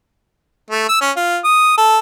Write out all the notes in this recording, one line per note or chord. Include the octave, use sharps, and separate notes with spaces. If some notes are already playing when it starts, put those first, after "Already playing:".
A3
E6
C#4
F4
D#6
A4